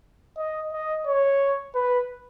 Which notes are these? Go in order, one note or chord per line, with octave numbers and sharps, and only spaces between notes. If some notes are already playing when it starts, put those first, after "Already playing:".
D#5
D#5
C#5
B4